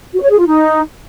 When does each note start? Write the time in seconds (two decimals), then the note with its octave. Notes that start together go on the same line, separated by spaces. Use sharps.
0.13 F#4
0.21 C#5
0.30 G#4
0.38 F4
0.47 D#4